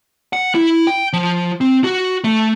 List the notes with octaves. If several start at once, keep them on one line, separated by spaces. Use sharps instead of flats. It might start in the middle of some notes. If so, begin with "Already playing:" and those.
F#5
E4
G5
F3
C4
F#4
A3